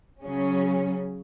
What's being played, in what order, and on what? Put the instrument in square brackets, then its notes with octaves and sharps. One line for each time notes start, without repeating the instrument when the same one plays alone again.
[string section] C#3 F#3 C#4